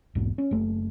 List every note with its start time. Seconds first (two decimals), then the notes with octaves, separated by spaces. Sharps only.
0.15 B1 E2 G#2
0.38 C#4
0.51 F#1 A3